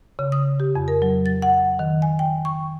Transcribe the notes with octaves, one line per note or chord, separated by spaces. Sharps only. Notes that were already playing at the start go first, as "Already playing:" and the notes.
C#3
D#6
G4
F2
A#4
F#3
A6
F#5
D#3
G#5
G5
C#6